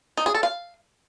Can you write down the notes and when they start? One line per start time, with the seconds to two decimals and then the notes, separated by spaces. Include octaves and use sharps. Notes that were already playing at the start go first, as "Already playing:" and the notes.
0.17 D#4
0.26 G#4
0.34 A4
0.43 F5